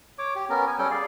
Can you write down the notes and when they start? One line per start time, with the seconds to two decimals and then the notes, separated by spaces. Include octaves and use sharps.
0.18 C#5 D6
0.35 G4
0.50 B3 C#4 A#4
0.67 G#5
0.79 G3 C#4 A4 G5
0.91 G#4 D5 F5